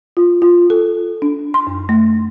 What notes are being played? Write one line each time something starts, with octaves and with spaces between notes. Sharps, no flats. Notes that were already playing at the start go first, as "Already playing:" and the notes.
F4
F4
A4
D4
C6
F#2
A3